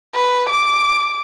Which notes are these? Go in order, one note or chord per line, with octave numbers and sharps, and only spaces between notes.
B4
D6